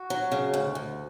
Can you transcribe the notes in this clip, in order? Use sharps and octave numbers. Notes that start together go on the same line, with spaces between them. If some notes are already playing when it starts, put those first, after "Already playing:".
Already playing: F#4
F#3
C#3
D2
D2